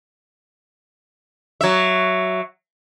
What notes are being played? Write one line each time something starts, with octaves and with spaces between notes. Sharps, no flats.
F#3 E5